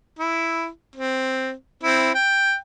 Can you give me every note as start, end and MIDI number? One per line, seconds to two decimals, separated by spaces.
0.19 0.68 64
0.96 1.52 60
1.83 2.11 60
1.83 2.11 64
2.15 2.56 79